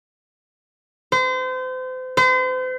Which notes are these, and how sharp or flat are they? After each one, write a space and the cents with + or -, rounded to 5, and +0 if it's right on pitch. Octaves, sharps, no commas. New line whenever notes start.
C5 -35
C5 -40